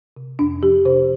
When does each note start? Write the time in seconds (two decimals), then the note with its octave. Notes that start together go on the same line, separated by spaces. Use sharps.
0.17 C3
0.39 F2 D4
0.62 F3 G4
0.86 C3 C5